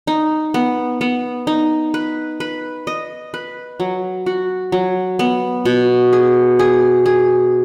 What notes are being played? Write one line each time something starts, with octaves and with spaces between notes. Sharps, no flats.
D#4
B3
B3
D#4
B4
B4
D#5
B4
F#3
F#4
F#3
B3
B2
G#4
G#4
G#4